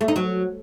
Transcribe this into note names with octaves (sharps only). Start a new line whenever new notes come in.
A3
D#4
F#3